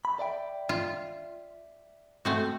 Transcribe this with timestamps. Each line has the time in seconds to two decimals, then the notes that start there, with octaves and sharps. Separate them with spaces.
0.05 B5
0.19 D5 E5 G5
0.69 F4
2.25 A3 C4 F#4